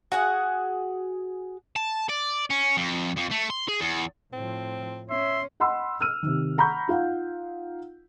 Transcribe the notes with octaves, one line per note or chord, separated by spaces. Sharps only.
F#4 G#4 F#5
A5
D5
C#4
F2
F2
A3
C6
G#4
E2
A2 F3 C4
C#4 E5 C6
D#5 F#5 B5 C6 E6
E6 F6 D#7
C3 D#3
F#5 A#5 B5 C#6 G6
D#4 F4 F5 F#5